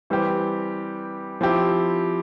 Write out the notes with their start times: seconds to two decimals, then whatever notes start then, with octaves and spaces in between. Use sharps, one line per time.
0.10 E3 G3 C4 G4
1.41 F3 C4 E4 G4